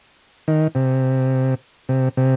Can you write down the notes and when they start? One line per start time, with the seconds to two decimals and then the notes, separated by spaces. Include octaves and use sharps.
0.48 D#3
0.75 C3
1.89 C3
2.17 C3